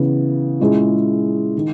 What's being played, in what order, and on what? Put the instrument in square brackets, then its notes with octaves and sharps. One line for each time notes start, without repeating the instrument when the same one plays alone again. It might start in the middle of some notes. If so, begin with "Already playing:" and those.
Already playing: [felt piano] C#3 E3 B3
A#2 G#3 C#4 E4 G#4
D#3